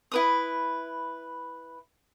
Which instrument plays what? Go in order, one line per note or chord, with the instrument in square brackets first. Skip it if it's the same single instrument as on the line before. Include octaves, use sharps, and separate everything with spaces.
[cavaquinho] E4 B4 D#6